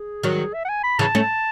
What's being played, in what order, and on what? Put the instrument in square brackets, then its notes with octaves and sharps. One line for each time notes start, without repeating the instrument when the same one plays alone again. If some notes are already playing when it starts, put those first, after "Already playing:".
Already playing: [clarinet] G#4
[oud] D#3 F#3
[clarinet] E5
F#5
G#5
B5
[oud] C#3 E3 [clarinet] A5
[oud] A3 C#4